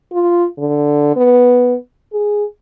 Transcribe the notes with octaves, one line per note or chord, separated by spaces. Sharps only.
F4
D3
B3
G#4